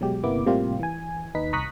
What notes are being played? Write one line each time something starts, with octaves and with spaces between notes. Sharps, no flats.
B2 F#3 G#3 G4
G1 C3 A#3 B3 E4 D6
A2 C3 G3 A#3 F4 G4
E3 G#5
D#2 D#4 B4 B6
C2 A#5 C#6 D#6 F#6 B6